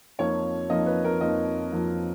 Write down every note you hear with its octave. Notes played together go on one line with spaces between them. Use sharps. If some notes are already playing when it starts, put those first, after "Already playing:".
F2 F3 A#3 D#4 C#5
F2 F3 A#3 D#4 D#5
B4
A#4
F2 F3 A#3 D#4 D#5
F2 F3 A#3 D#4